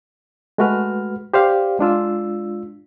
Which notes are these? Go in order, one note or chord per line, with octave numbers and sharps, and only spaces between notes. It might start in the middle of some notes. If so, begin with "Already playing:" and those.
G#3 A3 F#4 B4 F6
G4 C5 D5 F5
G#3 D4 F4 E6